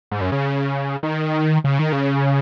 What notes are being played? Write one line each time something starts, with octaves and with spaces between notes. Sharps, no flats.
G#2
F#2
C#3
D#3
C#3
D#3
C#3